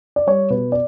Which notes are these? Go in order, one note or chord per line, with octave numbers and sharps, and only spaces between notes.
D5
G3 C#5
B2 B4
D5